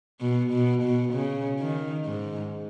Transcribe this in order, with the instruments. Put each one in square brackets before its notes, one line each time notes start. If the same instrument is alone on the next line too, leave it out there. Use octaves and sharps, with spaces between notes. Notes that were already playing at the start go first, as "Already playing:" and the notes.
[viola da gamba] B2
B2
B2
C#3
D#3
G#2